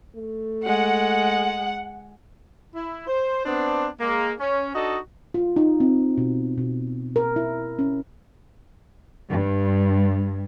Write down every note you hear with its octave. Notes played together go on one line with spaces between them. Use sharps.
A3
G#3 F#5
E4
C5
B3 C4 D4
G#3 A#3
C#4
D4 D#4 F#4 A4 D#5
F4
D#4
C4
B2
B2
A#4
E4
C#4
G2